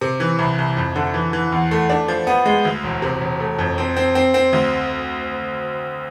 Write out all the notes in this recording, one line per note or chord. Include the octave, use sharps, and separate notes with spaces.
C3
E3
C2
C2
F2
D3
E3
E3
E2
A3
D4
F3
B3
G#3
D2
E1
C3
E1
A3
F2
C4
C4
C4
C4
D2